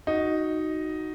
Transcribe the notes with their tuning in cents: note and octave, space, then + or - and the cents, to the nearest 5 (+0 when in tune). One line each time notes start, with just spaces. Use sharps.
D#4 +0 F#4 +0